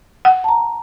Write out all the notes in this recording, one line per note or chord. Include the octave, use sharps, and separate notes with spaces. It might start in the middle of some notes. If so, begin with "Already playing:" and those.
F#5
A5 A#5